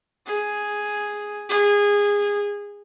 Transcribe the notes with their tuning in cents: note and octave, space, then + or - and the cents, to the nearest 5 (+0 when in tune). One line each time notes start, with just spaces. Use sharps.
G#4 +0
G#4 -20